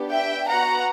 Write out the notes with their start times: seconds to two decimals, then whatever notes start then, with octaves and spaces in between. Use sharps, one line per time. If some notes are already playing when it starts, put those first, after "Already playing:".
Already playing: B3 D4 G4
0.10 E5 G5
0.47 B3 F#4 F#5 A#5